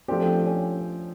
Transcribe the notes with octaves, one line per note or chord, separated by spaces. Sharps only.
F3 A3 C4 D4 G4
C#4